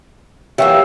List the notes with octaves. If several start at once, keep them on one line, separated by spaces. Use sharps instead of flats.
E3 F#3 A#3 G4 C#5 E5 G5